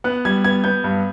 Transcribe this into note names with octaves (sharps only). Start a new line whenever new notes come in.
B3 F#6
G3 G#6
B3 G#6
B3 G6
G2